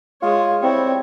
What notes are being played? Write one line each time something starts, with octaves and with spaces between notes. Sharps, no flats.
G#3 F4 C#5
G3 C4 E4 C#5